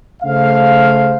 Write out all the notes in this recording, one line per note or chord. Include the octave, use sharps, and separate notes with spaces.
C#3 A3 C5 F5